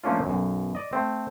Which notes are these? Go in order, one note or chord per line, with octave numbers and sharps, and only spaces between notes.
F3 A3 A#3 C#4 D4 F4
B1 F#2
D5 D#5
A3 C4